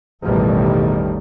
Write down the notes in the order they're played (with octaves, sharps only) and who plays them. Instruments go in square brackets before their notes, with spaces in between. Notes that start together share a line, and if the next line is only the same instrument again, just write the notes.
[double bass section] A1 E2 B2 D#3 G3